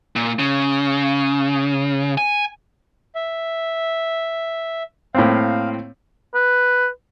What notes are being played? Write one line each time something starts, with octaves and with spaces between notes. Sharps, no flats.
A#2
C#3
G#5
E5
A2 A#3 C4 F5
B4